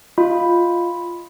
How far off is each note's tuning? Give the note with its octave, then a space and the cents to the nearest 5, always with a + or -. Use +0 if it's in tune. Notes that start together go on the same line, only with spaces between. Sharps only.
F4 +0 D#5 +5 B5 +0